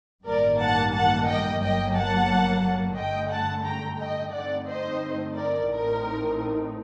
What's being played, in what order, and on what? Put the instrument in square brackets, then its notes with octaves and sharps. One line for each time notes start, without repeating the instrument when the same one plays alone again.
[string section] A1 G2 D#3 G3 A#3 A#4 D5
F#5 A5
F#5 A5
D#5 G5
G1 G2 F#3 A#3 D#5 G5
F#5 A5
G2 D3 A3 D#5 G5
F#5 A5
G5 A#5
D#5 G5
G2 D3 A3 C4 D#4 D5 F#5
C5 D#5
A#4 D5
A1 A2 A3 C4 D#4 A#4